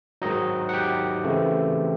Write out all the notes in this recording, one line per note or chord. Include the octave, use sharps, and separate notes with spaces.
G#2 D#3 F#3 D#4 D#5
F#5
G4 G5
C#3 E3 A3 C4